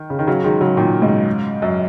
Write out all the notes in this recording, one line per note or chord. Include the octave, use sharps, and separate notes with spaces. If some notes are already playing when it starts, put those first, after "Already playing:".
Already playing: D#3
C#3
D#3
C#3 F#3
D#3 G#3
C#3 F#3
A#2 D#3
G#2 C#3
F#2